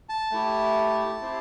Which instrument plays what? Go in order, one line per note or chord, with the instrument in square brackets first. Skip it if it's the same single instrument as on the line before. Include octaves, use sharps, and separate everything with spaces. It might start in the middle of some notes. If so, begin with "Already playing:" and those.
[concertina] A5
A3 E4 G4
C4 E4 G4